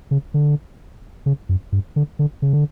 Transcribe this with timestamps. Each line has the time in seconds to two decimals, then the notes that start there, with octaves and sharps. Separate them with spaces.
0.11 C#3
0.34 D3
1.26 C#3
1.49 F#2
1.72 G2
1.96 D3
2.19 D3
2.42 C#3
2.53 D3